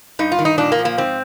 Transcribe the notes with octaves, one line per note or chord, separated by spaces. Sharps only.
G2 D#4
F4
D#3
D#4
A#2 D4
A#3
F3
A#3
G#2 C4